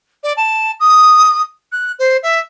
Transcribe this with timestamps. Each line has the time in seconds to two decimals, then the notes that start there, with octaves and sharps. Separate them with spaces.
0.23 D5
0.37 A5
0.80 D#6
1.72 F#6
1.99 C5
2.23 E5